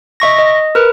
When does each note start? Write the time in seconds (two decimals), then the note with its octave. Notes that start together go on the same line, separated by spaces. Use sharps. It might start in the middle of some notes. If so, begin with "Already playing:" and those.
0.20 D#5 E5 C#6 A#6
0.39 D#5
0.75 A#4 B4